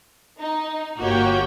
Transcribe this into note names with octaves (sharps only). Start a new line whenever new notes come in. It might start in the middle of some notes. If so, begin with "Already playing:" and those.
D#4
G1 A#3 F#4 G4 C#5 G5